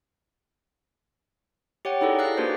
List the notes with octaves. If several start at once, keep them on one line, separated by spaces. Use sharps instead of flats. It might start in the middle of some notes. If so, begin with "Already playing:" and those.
G4 C#5 F#5 G5
D#4 E4 G#4 A4 D5
F5 F#6 A#6
A#3 D4 F#4 G4 B4 C5